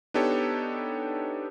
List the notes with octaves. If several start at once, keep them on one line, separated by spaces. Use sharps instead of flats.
B3 D4 D#4 G4 A4 C#5